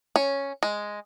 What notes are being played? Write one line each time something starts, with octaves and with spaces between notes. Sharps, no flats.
C#4
G#3